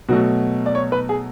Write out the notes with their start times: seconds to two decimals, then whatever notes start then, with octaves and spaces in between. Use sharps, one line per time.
0.09 B2 F#3 A3 F#4
0.66 D5
0.75 C#5
0.92 B4
1.09 G#4